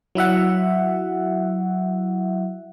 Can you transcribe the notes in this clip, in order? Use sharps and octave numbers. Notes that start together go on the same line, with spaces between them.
F#3 E4 E5 F#5